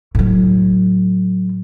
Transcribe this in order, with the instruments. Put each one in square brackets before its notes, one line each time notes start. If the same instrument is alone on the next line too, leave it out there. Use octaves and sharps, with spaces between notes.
[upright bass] A2 F#3